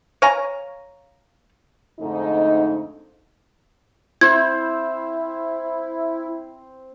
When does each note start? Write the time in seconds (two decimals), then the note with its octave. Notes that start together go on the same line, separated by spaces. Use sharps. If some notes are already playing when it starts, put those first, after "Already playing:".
0.22 C#5 F5 G#5 A#5
2.00 F2 G#2 D3 A3 D#4
4.21 C4 E4 C5 G#6